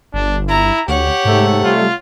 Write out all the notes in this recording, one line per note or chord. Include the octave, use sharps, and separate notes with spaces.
G1 D4
E4 A#5
D2 G4 C#5 F#5
G#2 C3 A3
G3 F4